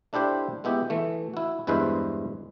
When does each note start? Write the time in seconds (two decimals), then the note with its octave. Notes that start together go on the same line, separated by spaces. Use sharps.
0.13 A3 D4 E4 G4 C5
0.64 G#3 B3 E4 G4
0.90 E3 A3
1.34 E4 F#4
1.67 E2 G2 G#3 E4 B4 C5